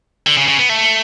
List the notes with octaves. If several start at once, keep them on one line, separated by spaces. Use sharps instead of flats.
D3
C#3
C#3
B3
A3